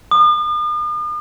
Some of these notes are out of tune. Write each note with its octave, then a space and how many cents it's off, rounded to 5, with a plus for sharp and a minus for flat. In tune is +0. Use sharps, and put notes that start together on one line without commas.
D#6 -45